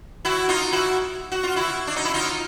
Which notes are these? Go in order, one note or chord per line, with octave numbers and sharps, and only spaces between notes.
E4 F#4
D#4 F4
E4 F#4
F#4
F4
E4 F#4
D4
D#4
E4
D#4 F4